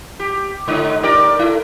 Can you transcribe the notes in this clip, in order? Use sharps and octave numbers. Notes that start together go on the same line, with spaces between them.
G4
G#2 D3 D#4
G4 A#4 D5
E4 A4